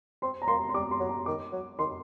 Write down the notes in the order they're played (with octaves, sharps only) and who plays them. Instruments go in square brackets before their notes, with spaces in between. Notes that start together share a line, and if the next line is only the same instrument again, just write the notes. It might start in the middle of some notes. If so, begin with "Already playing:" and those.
[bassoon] C4 [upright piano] C6
[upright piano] A#5
[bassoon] A#3 [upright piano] C6
[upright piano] C6
[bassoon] G3 [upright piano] D6
[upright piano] C6
[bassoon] F#3
[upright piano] A#5
[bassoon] D#3 [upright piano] D6
[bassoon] F#3
[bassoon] D#3 [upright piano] C6